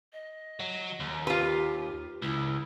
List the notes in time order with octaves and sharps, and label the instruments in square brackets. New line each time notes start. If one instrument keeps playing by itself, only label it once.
[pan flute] D#5
[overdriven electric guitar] F#3
D#2
[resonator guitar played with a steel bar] F4 B4 [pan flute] G4
[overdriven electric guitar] C#2 [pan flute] E4